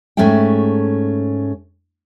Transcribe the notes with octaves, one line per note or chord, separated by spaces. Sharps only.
G#2 A3 C#4 G#4 E5 G5